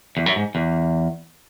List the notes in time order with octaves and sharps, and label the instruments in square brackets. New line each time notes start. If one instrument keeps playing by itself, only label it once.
[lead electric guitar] E2
F#2
G#2
E2